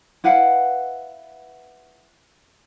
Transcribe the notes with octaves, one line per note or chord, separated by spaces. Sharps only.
E4 B4 F5 F#5